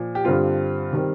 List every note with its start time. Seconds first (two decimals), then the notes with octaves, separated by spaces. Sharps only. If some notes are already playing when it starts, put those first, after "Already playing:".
Already playing: A#2 F3
0.15 G4
0.25 G2 D3 G3 C4 F4
0.93 D#3 G3 C4